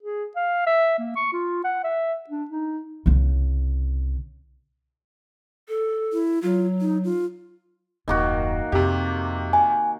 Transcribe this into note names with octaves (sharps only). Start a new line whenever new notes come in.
G#4
F5
E5
A#3
C#6
F4
F#5
E5
D4
D#4
C2 C#3
A4
E4
F#3 F4
D#4
F4
D#1 F#2 D#3 A#3 F#4
F2 C3 G4
G#5